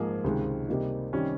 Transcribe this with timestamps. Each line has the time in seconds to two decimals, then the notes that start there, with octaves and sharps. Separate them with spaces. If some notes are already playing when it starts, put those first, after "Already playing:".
Already playing: G#2 F3 A#3 F4 G#4
0.24 C#2 C3 D#3 G#3
0.68 C3 G3 A#3 D#4
1.13 C3 D#3 G3 C#4